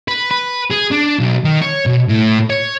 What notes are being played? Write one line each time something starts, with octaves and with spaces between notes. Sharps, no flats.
B4
B4
G#4
D4
B1
D#3
C#5
B2
A2
C#5